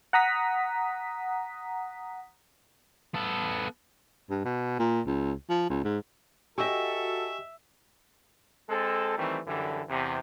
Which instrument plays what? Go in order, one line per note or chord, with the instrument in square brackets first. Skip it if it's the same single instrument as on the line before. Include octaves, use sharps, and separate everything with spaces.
[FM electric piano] F#5 A#5 D#6 B6
[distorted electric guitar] B3 A4
[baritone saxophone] G2
B2
A#2
C#2
F3
C#2
G#2
[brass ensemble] F#4 A4 [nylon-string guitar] G4 D#5 [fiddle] E5 [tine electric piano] G#5 C#6 E6
[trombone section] G#3 C4 A4
D#3 E3 G3 A3 C4
F#2 D3 E3 G3 A4
E2 C3